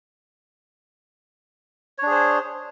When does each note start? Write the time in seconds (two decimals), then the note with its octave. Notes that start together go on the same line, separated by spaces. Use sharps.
1.98 C#5
2.03 D4
2.07 G#4
2.11 C5